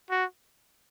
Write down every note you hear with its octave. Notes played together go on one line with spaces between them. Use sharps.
F#4